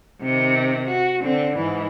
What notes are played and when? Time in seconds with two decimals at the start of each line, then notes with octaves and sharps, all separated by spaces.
0.22 C3 D#3
0.88 F#4
1.22 D3 C4
1.57 G#2 E3